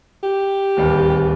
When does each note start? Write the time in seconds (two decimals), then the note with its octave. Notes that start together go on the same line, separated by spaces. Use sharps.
0.23 G4
0.77 D1 D#2 G3